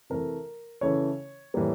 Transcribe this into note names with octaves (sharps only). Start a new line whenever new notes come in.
C3 E3 A3 A#4
C#3 E3 A3 C#5
A2 E3 G3 A#3